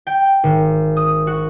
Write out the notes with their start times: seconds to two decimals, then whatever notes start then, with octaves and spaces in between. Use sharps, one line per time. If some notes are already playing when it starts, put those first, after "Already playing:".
0.07 G5
0.43 G#1
0.97 D#6
1.27 F#4